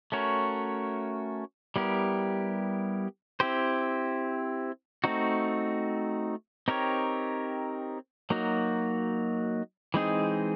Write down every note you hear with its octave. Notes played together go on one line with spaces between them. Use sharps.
A3 C#4 F#4 A#4 C#5
G3 B3 E4 G4 A#4
C4 E4 G4 C5
A3 C4 D#4 F#4
C4 D#4 G4 A#4 C#5
F#3 A#3 D#4 F#4
E3 G#3 C4 D#4 G#4